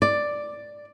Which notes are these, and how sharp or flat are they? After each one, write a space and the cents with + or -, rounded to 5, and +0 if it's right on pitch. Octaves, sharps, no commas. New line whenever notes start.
D5 +5